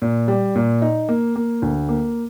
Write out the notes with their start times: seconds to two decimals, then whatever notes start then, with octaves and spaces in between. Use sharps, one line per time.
0.02 A#2
0.28 G3
0.55 A#2
0.82 D#4
1.09 A#3
1.36 A#3
1.62 D2
1.89 A#3